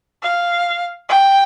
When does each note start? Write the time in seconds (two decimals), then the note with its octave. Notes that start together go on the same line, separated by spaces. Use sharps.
0.22 F5
1.09 G5